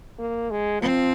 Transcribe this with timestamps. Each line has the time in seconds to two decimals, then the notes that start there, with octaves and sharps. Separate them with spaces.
0.19 A#3
0.51 G#3
0.81 F3 C4